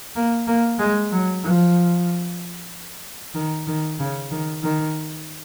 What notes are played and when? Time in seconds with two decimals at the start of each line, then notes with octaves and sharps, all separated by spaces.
0.16 A#3
0.47 A#3
0.79 G#3
1.12 F#3
1.44 F3
3.35 D#3
3.67 D#3
3.99 C#3
4.31 D#3
4.63 D#3